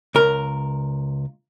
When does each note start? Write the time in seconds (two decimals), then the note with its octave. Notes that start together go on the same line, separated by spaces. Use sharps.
0.15 C#2 A#4